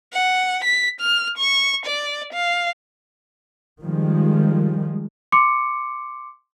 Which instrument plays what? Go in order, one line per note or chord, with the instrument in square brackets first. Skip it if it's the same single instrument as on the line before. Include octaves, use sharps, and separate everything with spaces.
[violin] F#5
B6
F6
C#6
D5
F5
[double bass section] D#3 F3 G3 G#3
[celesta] C6 D6 C#7